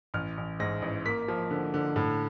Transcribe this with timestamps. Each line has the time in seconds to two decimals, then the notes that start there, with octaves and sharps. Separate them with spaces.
0.14 A1 F6
0.37 A1
0.60 G#2 A#6
0.82 A1
1.06 A#3 B6
1.28 F3
1.51 D3
1.74 D3
1.96 A2